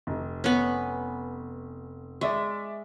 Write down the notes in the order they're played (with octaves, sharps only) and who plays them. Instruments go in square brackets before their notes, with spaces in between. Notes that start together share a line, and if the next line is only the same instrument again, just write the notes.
[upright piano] F1
[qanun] B3 C#4
[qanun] G#3 [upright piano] D5 E5 C#6